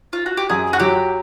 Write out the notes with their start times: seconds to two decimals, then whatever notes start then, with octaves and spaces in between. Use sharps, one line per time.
0.13 F4
0.26 F#4
0.37 G4
0.50 F#2 G#4
0.73 F#4
0.80 F#3 G4